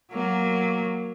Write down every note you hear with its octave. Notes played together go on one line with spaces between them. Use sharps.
F#3 A#3